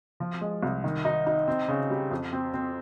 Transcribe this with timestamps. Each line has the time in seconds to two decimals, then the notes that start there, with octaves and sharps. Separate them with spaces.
0.20 F3
0.41 G#3
0.63 C2
0.84 D#3
1.05 D#4
1.27 D#4
1.48 C4
1.68 C#3
1.91 G3
2.11 F2
2.33 C4
2.54 C4